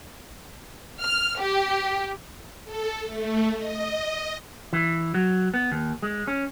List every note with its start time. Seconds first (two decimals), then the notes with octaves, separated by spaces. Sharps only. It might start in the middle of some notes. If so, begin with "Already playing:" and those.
1.02 F6
1.39 G4
2.65 A4
3.05 A3
3.56 D#5
4.73 E3
5.14 F#3
5.54 B3
5.72 D#2
6.02 G#3
6.28 C#4